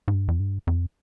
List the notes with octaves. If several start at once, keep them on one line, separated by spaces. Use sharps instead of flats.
G#2
G2
F2
G2
F2